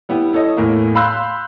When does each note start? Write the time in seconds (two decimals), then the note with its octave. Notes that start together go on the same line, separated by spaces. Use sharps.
0.09 G3 B3 E4 G4
0.33 E4 A4 C#5 D#5
0.57 E2 A2 A3 A#3
0.95 F5 B5 C6 E6 F#6 G6